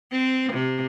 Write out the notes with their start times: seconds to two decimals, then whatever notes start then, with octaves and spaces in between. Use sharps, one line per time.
0.12 C4
0.52 C3